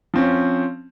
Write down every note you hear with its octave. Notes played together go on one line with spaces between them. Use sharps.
F3 C4 C#4